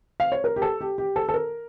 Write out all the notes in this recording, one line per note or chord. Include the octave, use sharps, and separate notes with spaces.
F5
C#5
A#4
G4
A4
G4
G4
A4
A4
A#4